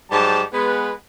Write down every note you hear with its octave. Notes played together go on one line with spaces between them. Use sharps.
G#2 F#3 G3 G4 A5
G#3 B3 B4